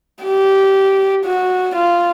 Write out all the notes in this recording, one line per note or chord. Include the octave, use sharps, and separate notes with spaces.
G4
F#4
F4